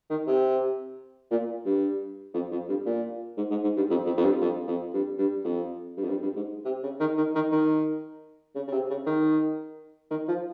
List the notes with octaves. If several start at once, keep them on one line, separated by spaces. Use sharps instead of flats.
D#3
C3
A#2
G2
F2
F2
G2
A#2
G#2
G#2
G#2
G2
F2
F2
F2
G2
F2
F2
G2
G2
F2
G2
F2
G2
G2
G#2
C3
C#3
D#3
D#3
D#3
D#3
C#3
C#3
C3
C#3
D#3
D#3
F3